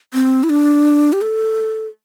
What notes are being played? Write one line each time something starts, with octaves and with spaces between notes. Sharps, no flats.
C4
E4
D4
G4
A4